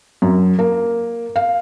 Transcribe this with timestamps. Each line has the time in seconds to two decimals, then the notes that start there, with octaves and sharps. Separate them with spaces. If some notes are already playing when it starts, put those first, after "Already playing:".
0.22 F#2
0.59 A#3
1.36 F5